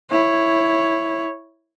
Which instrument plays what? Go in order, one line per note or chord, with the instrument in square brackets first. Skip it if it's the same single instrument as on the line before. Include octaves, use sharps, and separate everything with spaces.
[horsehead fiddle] E4 C#5